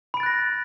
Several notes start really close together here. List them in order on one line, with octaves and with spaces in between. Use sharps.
B5 D7 A6 F#6 A#6